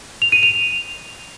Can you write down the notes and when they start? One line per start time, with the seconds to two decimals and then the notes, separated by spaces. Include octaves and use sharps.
0.22 F7
0.32 D#7
0.43 F7